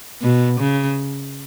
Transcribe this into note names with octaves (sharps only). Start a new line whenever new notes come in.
B2
C#3